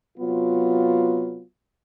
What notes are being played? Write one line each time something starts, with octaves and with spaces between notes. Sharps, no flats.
C3 F#3 B3 F4